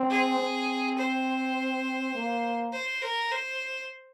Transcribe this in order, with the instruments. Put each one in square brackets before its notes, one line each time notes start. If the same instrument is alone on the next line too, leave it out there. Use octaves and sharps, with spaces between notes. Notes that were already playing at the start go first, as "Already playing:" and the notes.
Already playing: [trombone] C4
[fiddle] G#4
[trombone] C4
[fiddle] C5
[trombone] A#3
[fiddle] C5
A#4
C5